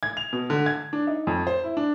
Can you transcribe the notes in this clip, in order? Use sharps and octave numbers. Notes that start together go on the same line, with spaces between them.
G#6
F7
B2
D3
G#6
D4
D#4
F2
C5
E4
D4